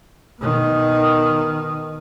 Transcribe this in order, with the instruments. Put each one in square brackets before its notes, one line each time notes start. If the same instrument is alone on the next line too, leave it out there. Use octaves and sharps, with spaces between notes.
[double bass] B2 D#3